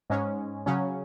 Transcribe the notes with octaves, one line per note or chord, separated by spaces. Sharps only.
G#2 G#3 C#4
C#3 F#3 C#4